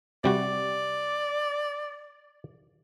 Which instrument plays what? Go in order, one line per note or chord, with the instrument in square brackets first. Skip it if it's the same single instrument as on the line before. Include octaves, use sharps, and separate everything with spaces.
[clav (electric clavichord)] C3 G3 F#4 [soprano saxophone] D5